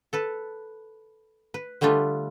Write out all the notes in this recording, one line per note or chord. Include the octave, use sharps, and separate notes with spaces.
A4 B4 A5
B4
D3 G3 A3 D4 F4 B4